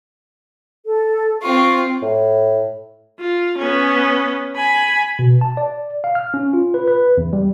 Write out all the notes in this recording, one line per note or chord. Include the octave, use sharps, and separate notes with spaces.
A4
C4 F4 C#6
A2
F4
B3 C#4
G#5 B5
B2
A5
D5
F5
F6
C#4
F4
B4
B4
E2
G3